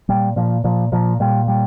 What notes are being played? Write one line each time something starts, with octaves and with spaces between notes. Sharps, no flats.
A#2 G3
A#2 F3
A#2 F3
A#2 F3
A#2 G3
G3